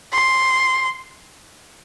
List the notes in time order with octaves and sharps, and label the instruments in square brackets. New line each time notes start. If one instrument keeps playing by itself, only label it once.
[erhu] C6